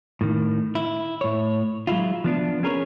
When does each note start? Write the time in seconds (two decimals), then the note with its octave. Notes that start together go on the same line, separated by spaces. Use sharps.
0.21 A2 D#3
0.75 E4
1.21 A2 C#5
1.87 F#3 G#3 E4 F4
2.24 F3 B3 D4
2.63 C#4 G#4 A#4 B4 C#5